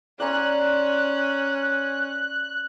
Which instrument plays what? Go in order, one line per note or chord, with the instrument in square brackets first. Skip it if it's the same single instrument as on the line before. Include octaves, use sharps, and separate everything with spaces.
[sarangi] C#4 [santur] D5 A#5 C6 [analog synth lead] F#6